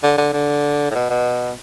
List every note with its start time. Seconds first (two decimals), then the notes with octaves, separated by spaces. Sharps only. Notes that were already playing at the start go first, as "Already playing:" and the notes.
0.03 D3
0.18 D3
0.33 D3
0.91 A2
0.95 B2
1.10 B2